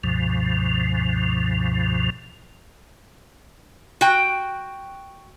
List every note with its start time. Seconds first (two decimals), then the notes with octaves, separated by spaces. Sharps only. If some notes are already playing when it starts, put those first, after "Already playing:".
0.04 C#2 G2 B2 F3
4.01 F#4 G5